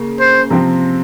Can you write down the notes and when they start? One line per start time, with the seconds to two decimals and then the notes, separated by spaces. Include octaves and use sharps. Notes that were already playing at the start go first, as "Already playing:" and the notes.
Already playing: C#3 A#3
0.20 C5
0.50 C3 F3 C4